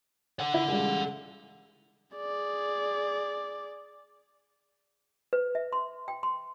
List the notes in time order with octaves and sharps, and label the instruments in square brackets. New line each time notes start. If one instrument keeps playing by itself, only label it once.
[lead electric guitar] A4 F#5
[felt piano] E4
C#3 G3 G#3
[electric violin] G#4 D5
[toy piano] B4
E5
C6
G5
C6